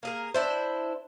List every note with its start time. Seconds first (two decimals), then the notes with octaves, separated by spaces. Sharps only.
0.03 A#3 G#4 A#4
0.34 D4 E4 C5